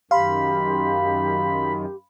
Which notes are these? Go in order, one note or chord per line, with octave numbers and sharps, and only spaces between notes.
F#2 D#3 G4 F5 B5 C6